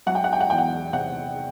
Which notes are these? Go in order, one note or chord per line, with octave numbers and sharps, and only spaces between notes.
F#3 F#5
G5
F#5
G5
F#5
E2 G5
F#5
C3 F#5